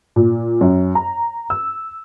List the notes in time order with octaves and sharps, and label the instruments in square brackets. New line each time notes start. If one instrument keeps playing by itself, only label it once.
[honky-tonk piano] A#2
F#2
A#5
E6